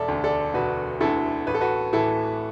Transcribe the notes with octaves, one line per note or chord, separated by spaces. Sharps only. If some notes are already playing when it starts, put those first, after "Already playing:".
Already playing: E1 A4 D5 E5
D2 D3
A4 D5
E1 F#4 B4
D2 D3 E4 A4
A1 B4
A4
F#4 B4
A2 E3 E4 A4